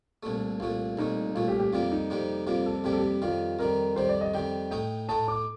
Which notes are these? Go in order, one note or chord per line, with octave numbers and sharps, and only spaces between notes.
C2 A#2 A3 A4
C2 A#2 A3 F4
C2 A#2 A3 D#4
C2 A#2 A3 F4
G4
G4
F2 C3 G3 A#3 F4
D#4
F2 C3 G3 A#3
F2 C3 G3 A#3 F4
A4
F2 C3 G3 A#3 G4
A4
G4
F2 D#3 G3 F4
F2 D#3 G3 A#4
F2 D#3 G3 C5
D5
D#5
F2 D#3 G3 G5
A2 A3 D#4 G5
A2 A3 D#4 A5
D6